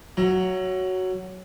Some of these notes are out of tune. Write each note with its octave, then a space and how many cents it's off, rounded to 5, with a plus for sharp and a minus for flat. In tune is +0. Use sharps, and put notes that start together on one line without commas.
F#3 +5 E5 +30 A#5 +25